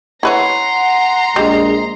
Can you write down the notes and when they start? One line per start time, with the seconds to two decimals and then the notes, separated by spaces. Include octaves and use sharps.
0.23 E4 B4 C#5 F#5 A#5 C6
1.36 A#1 G3 G#3 D#5